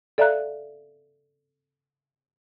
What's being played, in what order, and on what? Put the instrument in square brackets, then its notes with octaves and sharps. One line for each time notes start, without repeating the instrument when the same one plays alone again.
[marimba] A4 D5 E5 F5 A#5 F#6